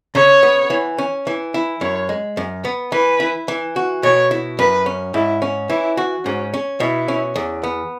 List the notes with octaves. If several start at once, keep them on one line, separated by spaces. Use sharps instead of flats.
C#3 C#5
B3
E3
C#4
E3
E4
F#2 C#5
G#3
F#2
B3
E3 B4
E4
E3
F#4
B2 C#5
E4
F#2 B4
C#4
G#2 E4
C#4
E3 E4
F#4
G#2 C#4
C#4
B2 E4
C#4
E2
B3